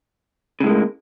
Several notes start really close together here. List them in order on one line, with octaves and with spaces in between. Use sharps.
C#3 A2 G#3 A#3